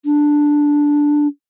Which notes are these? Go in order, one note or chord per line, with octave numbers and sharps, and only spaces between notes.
D4